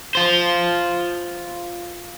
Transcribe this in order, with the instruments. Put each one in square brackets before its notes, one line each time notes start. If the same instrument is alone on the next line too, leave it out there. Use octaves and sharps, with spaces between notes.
[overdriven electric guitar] F4 C5